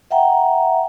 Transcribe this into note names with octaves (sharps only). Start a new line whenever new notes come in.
E5 F#5 G5 A#5